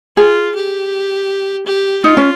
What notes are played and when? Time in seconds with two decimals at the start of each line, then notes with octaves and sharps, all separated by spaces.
0.17 F4 G#4
0.55 G4
1.66 G4
2.04 D#4 F4
2.17 C#4